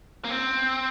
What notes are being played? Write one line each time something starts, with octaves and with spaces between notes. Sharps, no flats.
A#3
C4